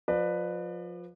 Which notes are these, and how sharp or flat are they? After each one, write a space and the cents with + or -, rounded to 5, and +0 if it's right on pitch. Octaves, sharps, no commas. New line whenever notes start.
F3 +25 B4 +0 D5 +35